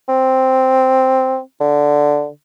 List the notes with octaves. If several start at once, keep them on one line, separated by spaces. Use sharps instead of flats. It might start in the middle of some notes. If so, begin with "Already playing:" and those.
C4
D3